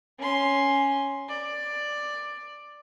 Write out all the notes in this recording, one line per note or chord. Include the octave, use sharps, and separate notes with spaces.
C#4 C6
D5